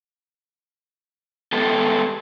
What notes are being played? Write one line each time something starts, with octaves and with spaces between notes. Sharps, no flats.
G#3 B3 G4 A4